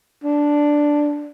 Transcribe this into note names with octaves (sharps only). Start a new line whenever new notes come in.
D4